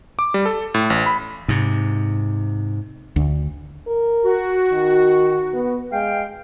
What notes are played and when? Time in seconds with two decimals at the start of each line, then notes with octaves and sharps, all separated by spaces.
0.19 D6
0.34 G3
0.46 A4
0.74 A2
0.90 A1
1.06 B5
1.48 G#2 C3
3.16 D2
3.87 A#4
4.24 F#4
4.72 D#3
5.54 B3
5.92 G#3 F5 G5